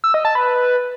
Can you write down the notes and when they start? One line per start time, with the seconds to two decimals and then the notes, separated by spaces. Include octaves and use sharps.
0.04 E6
0.14 D#5
0.25 A5
0.35 B4